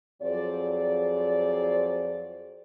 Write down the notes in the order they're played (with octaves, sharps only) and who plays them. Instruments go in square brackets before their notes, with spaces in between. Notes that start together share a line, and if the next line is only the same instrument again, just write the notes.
[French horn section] F2 F#3 G#4 C5 D5